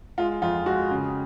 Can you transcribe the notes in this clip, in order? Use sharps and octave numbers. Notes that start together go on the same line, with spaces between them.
G#3 F4
F2 F4
G#3 F#4
C#3